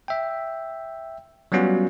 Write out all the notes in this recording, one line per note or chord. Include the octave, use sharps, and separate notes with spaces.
E5 G5
F#3 G3 B3 C#4 F4 F#4